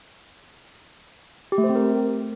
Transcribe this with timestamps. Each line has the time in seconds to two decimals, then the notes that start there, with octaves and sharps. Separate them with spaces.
1.52 G4
1.58 A3
1.64 C5
1.70 C4
1.75 A#4